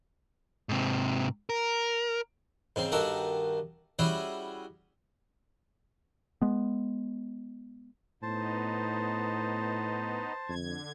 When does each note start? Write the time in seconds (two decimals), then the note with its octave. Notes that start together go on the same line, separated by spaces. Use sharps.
0.69 G#2 C3
1.50 A#4
2.76 G#2 C#3 C4
2.92 G2 D#3 F#4 A4 A#4
3.99 G3 C#4 E4 F#4 G#4
6.42 G#3 B3
8.22 A2 B3 D#4 C5 A5
10.49 F2 D3 G#6